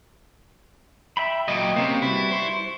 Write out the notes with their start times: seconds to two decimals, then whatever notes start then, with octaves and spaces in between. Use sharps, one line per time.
1.17 E5 G5 B5
1.48 A#2 F#3 D#5 G5
1.76 C3 A#3 C4 C#4
2.02 G3 E4 F#4 B4
2.31 C5 C6 C#6